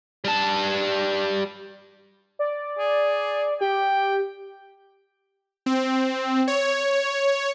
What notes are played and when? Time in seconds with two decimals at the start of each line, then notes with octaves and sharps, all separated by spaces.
0.24 G3 A5
2.39 D5
2.79 G#4
3.61 G4 G5
5.66 C4
6.48 C#5